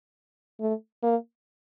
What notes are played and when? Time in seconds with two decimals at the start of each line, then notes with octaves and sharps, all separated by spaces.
0.60 A3
1.03 A#3